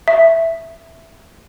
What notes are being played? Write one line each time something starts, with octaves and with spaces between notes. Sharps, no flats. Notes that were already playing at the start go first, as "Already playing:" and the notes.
E5